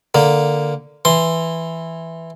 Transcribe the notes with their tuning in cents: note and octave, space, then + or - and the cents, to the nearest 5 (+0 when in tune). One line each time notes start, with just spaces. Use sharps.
D3 +0 A#3 +0
E3 +0 C6 +0